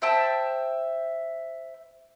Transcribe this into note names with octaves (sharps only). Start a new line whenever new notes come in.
C5 E5 G5 A5